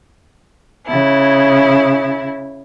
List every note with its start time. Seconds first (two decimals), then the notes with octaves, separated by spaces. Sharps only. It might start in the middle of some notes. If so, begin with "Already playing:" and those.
0.86 C#3 E4